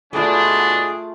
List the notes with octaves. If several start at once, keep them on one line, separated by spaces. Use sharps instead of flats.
G#2 B2 A3 D4 F4 G#4